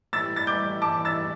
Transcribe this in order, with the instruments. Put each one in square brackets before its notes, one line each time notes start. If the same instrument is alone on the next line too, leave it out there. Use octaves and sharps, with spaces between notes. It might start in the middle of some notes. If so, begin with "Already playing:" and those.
[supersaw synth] A2 E3 G3 E4 [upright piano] E6 A6
[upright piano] A6
D6 G6
A5 D6
E6 A6